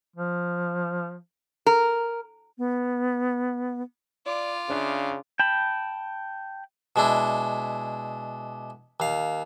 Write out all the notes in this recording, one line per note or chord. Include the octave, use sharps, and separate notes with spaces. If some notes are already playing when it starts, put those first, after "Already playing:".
F3
A#4
B3
F4 D5 D6
C#3 D4 D5 E5
G5 A5 B5
B2 G#3 D4 E4
D#2 F5